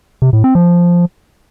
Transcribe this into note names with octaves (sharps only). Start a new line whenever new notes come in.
C3
A2
C4
F3